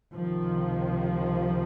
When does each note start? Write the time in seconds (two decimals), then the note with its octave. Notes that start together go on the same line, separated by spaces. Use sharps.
0.14 C#2 C3 D#3 F3